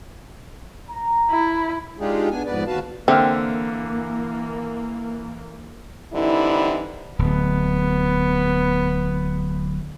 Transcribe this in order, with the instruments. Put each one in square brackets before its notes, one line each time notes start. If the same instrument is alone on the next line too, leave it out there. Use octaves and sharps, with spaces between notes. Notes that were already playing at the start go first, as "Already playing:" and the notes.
[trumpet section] A#5
[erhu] E4
[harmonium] G#3 D4 D#4 F4 G4 G#4
B3 D4 G#5
F2 G#2 B3 B4 D5
D#2 F#4 B4 F5 A5
[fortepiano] D3 E5 F6 [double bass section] E3 A#3 [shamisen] C4
[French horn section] D3 E3 G3 C4 D#4 E4
[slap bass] D1 [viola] B3